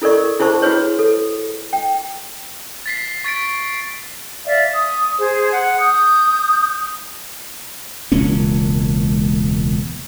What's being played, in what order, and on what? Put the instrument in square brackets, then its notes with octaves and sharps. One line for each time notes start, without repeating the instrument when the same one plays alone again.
[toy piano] E4 A4 A#4 D5 C#6
E4 G#4 C5 A5 C#6
E4 F#4 G#4 B4 C#5
A4
G5
[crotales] A6 B6 C7
C#6 A6 B6 D7
[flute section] D5 E5 F5
D#6
G#4 C5
F#5
D#6 G6
[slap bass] E1 C#2 A#3 C#4